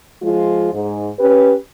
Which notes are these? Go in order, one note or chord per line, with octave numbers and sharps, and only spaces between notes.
F3 G#3 F4
G#2
C#4 G4 B4